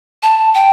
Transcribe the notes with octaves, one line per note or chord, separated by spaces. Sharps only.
A5
G5